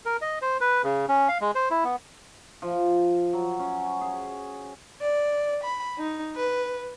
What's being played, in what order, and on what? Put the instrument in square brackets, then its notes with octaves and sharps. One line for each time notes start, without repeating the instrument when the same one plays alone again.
[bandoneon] A#4
D#5
C5
B4
C#3
C#4
F5
G#3
C5
E4
B3
[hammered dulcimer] F3
F#3
C#4
G#4
[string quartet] D5
B5
D#4
B4